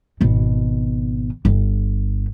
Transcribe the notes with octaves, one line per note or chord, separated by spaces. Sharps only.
G#1 B2
G1